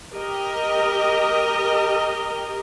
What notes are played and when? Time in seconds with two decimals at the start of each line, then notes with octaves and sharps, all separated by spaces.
0.14 G4 A#4 D#5